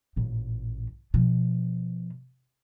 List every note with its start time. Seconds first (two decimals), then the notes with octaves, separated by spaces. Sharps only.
0.16 A1 A#2
1.14 B2 F3